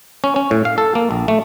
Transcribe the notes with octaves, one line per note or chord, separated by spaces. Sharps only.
C#4
C#4
A2
F5
A4
A#3
A#1
A3